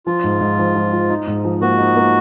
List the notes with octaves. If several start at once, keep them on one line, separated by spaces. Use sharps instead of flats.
F3 F4
G#2
G#2
F3
F3
F3
D#4
G#2
F3
A#3 F#4
D#4
A#3